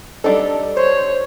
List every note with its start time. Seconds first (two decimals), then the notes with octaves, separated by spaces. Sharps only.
0.24 G3 D4 D#4 A4
0.77 C5 C#5